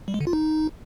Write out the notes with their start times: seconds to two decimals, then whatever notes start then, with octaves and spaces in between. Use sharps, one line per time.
0.08 G3
0.14 G#3
0.21 D3
0.27 F4
0.33 D#4